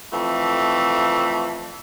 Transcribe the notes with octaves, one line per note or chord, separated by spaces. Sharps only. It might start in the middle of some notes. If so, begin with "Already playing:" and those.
F2 E3 A3